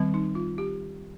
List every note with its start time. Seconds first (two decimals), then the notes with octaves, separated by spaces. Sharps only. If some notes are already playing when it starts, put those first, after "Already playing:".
Already playing: D#3 G3 C4
0.14 D#4
0.35 F4
0.58 G4